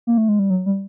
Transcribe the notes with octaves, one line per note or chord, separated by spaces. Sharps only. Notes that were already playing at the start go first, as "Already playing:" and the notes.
A#3
A3
G#3
G3
F#3
G3